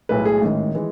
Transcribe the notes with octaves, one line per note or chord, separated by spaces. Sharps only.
B1 A2 G#3 B4
G#4
A1 G#2 D#3
E3 G#3